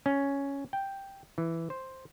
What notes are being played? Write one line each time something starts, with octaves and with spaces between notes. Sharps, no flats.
C#4
G5
E3
C5